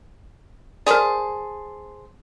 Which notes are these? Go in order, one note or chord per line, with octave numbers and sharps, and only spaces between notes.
G#4 A#4 C5 D5 A5